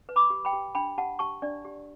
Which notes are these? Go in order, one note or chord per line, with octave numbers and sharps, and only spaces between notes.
B4
B5 D6
G4
G5 B5
G4
D4 G5 B5
G4 F#5 A5
G4 A5 C#6
D4 D5
G4